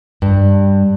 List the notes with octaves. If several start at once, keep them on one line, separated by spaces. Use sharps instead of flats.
G2